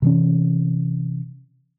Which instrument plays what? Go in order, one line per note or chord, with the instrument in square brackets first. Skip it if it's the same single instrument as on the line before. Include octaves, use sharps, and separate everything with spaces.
[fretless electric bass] C3 E3 C#4